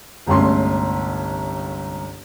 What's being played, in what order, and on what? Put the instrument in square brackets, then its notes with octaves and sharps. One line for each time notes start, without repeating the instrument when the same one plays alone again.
[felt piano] G1 C2 G#3 A3 C#4 C6